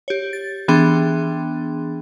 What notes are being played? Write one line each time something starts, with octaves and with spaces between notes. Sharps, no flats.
G4 C#5
A6
E3 B3 D4 G#4 G5 C6